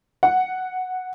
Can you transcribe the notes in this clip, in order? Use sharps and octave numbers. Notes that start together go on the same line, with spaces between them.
F#5